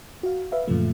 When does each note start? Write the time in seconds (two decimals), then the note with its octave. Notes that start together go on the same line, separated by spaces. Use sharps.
0.23 F#4 F5
0.52 B4 E5 F5
0.68 F#2 A#2 C#3 F3 A3